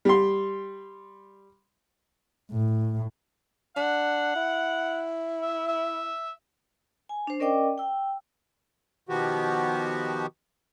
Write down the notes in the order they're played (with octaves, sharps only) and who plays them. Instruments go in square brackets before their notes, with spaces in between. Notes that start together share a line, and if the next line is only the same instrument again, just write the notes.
[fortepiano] G3 C6
[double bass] A2
[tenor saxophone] D4 [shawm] F#5
[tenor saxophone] E4
[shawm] E5
E5
[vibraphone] G#5
D4 C5
C#4 A#4 D5 D#5 G5 D6
G5 E6
[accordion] B2 D#3 F3 B3 F#4 G4